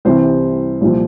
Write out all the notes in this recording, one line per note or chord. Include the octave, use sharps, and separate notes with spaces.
C2 C3 E3 G3 C4 C5
C2 A#2 F3